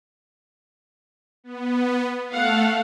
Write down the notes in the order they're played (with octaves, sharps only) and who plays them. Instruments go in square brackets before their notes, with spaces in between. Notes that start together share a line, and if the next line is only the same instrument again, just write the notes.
[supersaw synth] B3
[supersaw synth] A3 A4 [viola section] F5 F#5